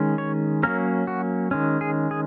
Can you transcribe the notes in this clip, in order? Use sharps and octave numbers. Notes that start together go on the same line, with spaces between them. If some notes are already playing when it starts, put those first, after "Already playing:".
Already playing: D#3 G#3 C#4
C#5
F#3 A#3 C#4 A#4
F#4
D#3 G#3 C#4
G#4
G#4